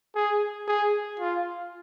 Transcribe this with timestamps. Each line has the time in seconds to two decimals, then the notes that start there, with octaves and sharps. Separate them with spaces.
0.15 G#4
0.68 G#4
1.20 F4